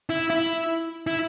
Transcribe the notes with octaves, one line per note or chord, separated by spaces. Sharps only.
E4
E4
E4